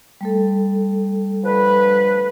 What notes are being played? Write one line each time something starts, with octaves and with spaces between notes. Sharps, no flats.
G3 A3 A4
D3 F3 B4